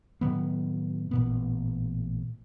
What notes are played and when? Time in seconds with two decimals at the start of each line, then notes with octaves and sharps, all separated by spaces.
0.21 A2 D#3 F#3 B3
1.11 A1 A#2 B3